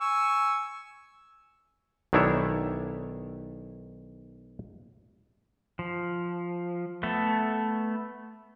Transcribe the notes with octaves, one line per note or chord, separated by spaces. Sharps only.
G#5 C#6 E6
B1 D#3 D4 E4 C#5 E5
F3
A3 B3 A4